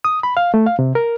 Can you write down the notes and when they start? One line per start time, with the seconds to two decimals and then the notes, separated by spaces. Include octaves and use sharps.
0.04 D#6
0.23 B5
0.37 F5
0.54 A3
0.66 F5
0.79 C3
0.95 A#4